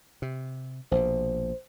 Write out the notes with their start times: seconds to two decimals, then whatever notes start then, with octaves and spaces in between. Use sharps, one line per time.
0.22 C3
0.92 A#1 B2 C5